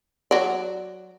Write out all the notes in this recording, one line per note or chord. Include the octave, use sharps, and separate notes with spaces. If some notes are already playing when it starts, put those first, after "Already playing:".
F#3 D5